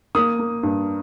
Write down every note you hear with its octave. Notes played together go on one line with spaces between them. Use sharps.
A#3 D#6
A#3
G2